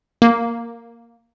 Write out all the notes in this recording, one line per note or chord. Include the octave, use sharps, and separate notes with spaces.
A#3